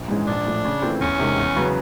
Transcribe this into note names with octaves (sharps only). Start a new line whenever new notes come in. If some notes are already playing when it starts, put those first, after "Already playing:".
Already playing: A#1
G#2 E3 G#3 C#4
A#1 D4
A2 F3
C#3
E3 A3 C4 F4
E2 C#4
C3 D#3 G#3
E2
C#3 F#3 B3